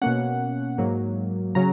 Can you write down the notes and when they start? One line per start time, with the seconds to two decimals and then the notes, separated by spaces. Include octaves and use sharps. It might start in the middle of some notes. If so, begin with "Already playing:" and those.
0.02 B2 A#3 C#4 F#5
0.78 G#2 F#3 A#3
1.55 C#3 F#3 C#4 A#5